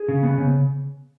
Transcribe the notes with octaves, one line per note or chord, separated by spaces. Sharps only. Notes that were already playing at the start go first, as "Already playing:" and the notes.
Already playing: G#4
C#3
B3
C#3